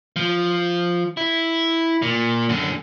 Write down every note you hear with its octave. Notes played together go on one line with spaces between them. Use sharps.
F3
E4
A#2
F#2 D3